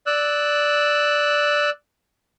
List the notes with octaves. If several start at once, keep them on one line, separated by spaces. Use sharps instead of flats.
D5 E6 F#6